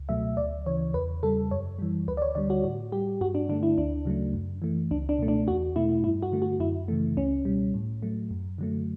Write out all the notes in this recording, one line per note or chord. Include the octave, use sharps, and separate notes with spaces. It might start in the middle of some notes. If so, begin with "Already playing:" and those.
Already playing: C#2
B2 F#3 A3 E5
D2 D5
C#3 E3 C#5
E2 B4
C#3 G3 A4
F#2 C#5
E3 G3
D2 B4
D5
C#5
D3 G3 D5
F#4
A2 F#4
G3 G4
G2 F#4
D4
D3 A3 D4
E4
D2 D4
C#3 F#3 A3
F#2
E3 A3
C#2 D4
D4
B2 A3
D4
E2 F#4
B2 A3 E4
G2 E4
F#4
D3 A3
F#4
F#2 E4
C#3 E3 A3
C#2 C#4
B2 G3
A2
F#3 A3
F#2
D3 F#3 A3